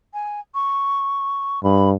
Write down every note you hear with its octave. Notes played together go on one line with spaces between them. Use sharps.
G#5
C#6
G2 B5